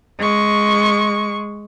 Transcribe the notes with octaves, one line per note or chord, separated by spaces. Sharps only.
G#3 C#6